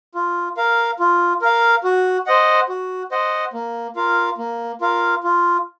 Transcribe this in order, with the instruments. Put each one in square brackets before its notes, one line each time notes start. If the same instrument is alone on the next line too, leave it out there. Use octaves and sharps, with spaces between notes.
[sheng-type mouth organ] F4
A#4 F5
F4
A#4 F5
F#4
C5 D#5 F#5
F#4
C5 D#5 F#5
A#3
F4 A#4 F5
A#3
F4 A#4 F5
F4